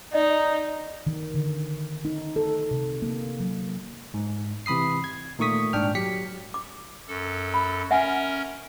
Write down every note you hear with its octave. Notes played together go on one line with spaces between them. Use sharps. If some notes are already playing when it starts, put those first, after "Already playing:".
D#4 D5 D#5
D#3
D3
D#4
A4
C3
A#3
F#3
G#2
C3 E3 B5 D#6 C7
G#6
A#2 D#3 A3 C#6 D#6 B6
G#2 D4 G5 F6
F#3 G4 B6 C#7
D6
F#2 A4
B5
C#4 A#4 E5 F#5 G#5